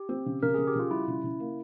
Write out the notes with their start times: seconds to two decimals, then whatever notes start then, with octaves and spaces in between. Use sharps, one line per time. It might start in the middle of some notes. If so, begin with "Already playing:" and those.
Already playing: G4
0.09 C4
0.26 C#3
0.43 C#3 A#4
0.54 C#3 G#4
0.67 G4
0.75 C#3 F4
0.91 G3 E4
1.08 C#3
1.24 C#3
1.40 A#3